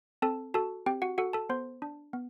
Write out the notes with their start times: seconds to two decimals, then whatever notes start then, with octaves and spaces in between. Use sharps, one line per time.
0.22 C4 A4 A5
0.54 F#4 A4 A5
0.86 C4 G4 G5
1.02 F#4 F#5
1.18 F#4 A4 F#5
1.33 A4 A5
1.49 B3 C5 C6
1.82 D4
2.13 B3